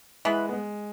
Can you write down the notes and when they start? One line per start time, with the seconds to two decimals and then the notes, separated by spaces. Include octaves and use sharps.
0.25 E3 G#3 B3 G#4 B4
0.49 B3
0.53 G#3